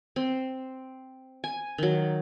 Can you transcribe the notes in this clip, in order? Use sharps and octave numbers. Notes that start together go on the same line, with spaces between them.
C4
G#5
D#3 F#3